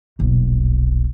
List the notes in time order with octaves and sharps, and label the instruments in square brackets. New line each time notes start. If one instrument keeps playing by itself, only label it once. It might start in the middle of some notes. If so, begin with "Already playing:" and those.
[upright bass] D#1 B1